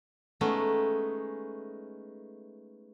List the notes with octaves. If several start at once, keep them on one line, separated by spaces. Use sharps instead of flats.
G#3 A3 B3 C#4 D#4